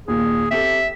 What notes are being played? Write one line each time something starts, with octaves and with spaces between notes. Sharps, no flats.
D#2 A#2 G#4
C4 G4 A4 E5